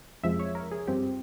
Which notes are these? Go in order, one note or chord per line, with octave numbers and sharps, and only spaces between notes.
F2 C3 F3 G#3 E5
C#5
A#4
G#4
G2 F3 C4 G4